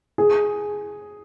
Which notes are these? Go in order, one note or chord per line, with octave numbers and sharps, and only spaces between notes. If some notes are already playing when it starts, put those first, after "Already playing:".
G#4